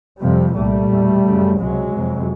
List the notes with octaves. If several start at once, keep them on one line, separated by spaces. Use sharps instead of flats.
F2 C3 F3 G3
C2 A#2 G3 A3
E2 B2
F#2 C#3
C#2 C3 F#3 G#3
F2 C3